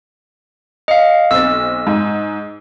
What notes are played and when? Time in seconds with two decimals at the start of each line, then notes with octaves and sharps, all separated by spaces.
0.88 D#5 F5 C#7
1.31 B1 C4 E6 A6
1.87 G#2